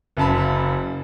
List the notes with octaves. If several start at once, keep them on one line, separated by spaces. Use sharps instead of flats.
F#1 F#2 A5 B5